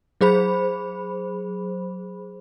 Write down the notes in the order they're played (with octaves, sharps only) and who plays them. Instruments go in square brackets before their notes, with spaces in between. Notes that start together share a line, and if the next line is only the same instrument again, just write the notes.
[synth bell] F#3 G#4 C5 B5